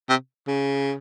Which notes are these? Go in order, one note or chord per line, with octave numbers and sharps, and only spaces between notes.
C3
C#3